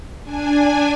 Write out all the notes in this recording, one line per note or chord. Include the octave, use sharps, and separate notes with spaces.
D4 G#5